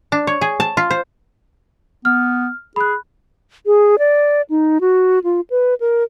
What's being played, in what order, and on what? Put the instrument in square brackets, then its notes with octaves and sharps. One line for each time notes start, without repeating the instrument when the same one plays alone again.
[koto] D4
C#5
G#4
A5
F4
C5
[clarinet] B3 [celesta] F6
[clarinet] G#4 [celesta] B5 F#6
[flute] G#4
D5
D#4
F#4
F4
B4
A#4